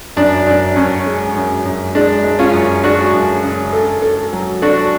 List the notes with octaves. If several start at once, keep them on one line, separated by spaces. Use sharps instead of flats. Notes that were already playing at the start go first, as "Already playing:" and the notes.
F#2 D4
F#2 D4
F#2 C#4
G#3
F#2
F#2
G#3 D4
G#3
C#4 F4
F#2
G#3 D4 F#4
F#2
C#3
A4
A4
F#3
D4 F#4 A4